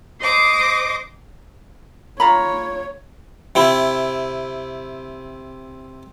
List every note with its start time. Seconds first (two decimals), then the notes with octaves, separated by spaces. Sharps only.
0.21 C5 D#5 D6 D#6
2.20 F4 C#5 A#5 B5
3.55 C3 C4 E4